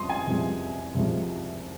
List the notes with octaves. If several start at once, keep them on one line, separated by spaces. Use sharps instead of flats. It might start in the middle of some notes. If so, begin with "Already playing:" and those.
Already playing: C2 C3 F3 G#3 C6 D#6
G#5
C2 C3 F3 G#3
C2 C3 F3 G#3